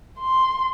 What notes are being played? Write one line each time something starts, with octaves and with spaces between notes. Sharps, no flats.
C6